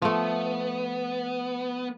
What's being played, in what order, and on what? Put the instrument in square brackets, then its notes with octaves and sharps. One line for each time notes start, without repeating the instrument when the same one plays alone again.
[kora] F3 A3 [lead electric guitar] B3